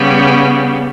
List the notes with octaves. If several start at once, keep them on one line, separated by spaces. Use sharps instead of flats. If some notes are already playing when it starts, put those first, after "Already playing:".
Already playing: C#3 G3 B3